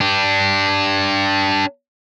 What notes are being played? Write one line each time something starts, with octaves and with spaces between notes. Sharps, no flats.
D4 G4